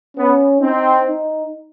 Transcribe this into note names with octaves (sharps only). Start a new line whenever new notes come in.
B3 C#4
C4 D#4
D#4